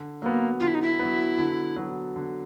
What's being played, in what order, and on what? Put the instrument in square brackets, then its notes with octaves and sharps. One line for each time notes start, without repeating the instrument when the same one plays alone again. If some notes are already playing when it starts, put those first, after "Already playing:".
Already playing: [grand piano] D3
[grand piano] F#3 B3 [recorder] A#3
[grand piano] D3 [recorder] F4
[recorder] E4
D#4
E4
[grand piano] F#3 B3
D3
F#3 B3
D3